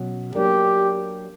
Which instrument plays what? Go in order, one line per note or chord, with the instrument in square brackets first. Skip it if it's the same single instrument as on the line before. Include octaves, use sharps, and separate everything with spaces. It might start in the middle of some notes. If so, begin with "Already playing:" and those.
Already playing: [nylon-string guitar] B2 F#3 C#4
[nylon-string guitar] F#3 A#3 D4 A#4 D5 [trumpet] G4